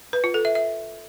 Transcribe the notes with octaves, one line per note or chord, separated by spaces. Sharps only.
B4
F4
A4
E5
E5